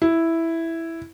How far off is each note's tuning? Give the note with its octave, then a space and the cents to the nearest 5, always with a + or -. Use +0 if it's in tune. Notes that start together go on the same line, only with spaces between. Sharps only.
E4 +0